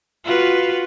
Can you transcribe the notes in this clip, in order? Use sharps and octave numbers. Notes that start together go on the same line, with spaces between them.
F4 F#4 B4